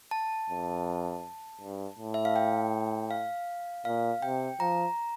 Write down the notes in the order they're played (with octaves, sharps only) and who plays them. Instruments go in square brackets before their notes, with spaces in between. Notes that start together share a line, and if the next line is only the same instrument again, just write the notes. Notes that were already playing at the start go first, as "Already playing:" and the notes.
[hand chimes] A5
[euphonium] F2
G2
A2
[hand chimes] E5
F5
G5
F5
[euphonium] A#2 [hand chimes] F5
[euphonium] C3 [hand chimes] G5
[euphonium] F3 [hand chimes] A#5